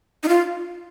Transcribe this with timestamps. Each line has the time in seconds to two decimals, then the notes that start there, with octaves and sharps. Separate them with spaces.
0.23 D#4
0.28 F4